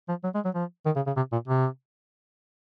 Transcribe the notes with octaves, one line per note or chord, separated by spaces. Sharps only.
F3
F#3
G#3
F#3
F3
D#3
C#3
C#3
C3
A#2
C3